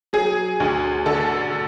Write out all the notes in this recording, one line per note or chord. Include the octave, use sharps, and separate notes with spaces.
F#3 G#4
D2
D3 A4